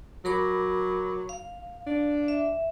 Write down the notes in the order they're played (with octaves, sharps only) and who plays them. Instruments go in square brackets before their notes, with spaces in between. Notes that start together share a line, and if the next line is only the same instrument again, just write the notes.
[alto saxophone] F#3 [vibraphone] A#4 B5 D6
[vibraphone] F5
[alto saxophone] D4
[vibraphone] E5